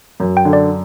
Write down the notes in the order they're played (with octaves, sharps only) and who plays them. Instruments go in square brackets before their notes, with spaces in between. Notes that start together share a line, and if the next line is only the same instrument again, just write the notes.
[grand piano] F#2
[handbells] G5
[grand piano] D3
[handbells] D5